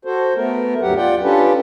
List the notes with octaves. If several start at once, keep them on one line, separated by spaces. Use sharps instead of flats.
F#4 A4 C5
A3 B3 A#4
D2 G2 F#3 G4 F#5
F4 D5 F#5 G5
C#4 D4 F4 G4 A4 B4